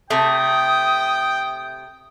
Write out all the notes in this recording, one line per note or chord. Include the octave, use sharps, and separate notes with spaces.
C3 A3 G5 D#6